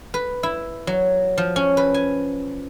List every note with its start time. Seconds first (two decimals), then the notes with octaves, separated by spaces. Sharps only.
0.14 B4
0.43 E4
0.87 F#3
1.38 F3
1.56 C#4
1.77 B4
1.94 G#5